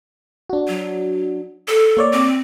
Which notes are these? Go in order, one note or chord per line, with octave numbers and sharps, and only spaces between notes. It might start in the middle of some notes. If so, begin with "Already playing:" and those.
D4 F#4
F#3
A4
A#3 C#5 D5
C4